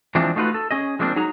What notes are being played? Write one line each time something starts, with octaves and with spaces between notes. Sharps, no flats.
E3 F3 G#3 C4 D4 F4
A3 D#4 F4 F#4 B4
A4
C#4 G#4 D#5
F3 G#3 A#3 C4 D4
F#3 D#4 G#4 A#5